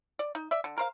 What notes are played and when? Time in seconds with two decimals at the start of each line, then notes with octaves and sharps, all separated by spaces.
0.19 D5
0.35 D#4
0.51 D5 E5
0.64 D3
0.78 A#4 C5 F5